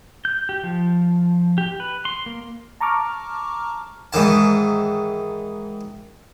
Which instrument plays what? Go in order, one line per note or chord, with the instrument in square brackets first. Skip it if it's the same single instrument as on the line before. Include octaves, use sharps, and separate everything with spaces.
[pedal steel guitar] G6
G4
F3
G4
B4
C6
A#3
[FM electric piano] A5 A#5 C#6 D6 F6
[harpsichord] G#2 D#3 E3 A5